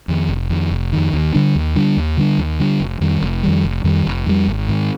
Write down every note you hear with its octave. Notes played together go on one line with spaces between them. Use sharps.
F2 D#3
F1
F2 D#3
F1
F2 D#3
D#2
D3 G3 D4
D#2
D3 G3 D4
D#2
D3 G3 D4
D#2
D3 G3 D4
F1
F2 D#3 G3
F1
F2 D#3 G3
F1
F2 D#3 G3
F1
F2 D#3 G3
G#1
G#2 D#3